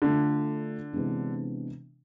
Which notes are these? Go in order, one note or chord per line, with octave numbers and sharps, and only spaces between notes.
D3 A3 D4 F4
C3 E3 G#3 B3 D4